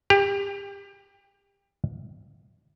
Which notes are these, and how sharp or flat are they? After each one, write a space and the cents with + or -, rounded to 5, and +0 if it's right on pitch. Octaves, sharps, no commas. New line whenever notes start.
G4 +30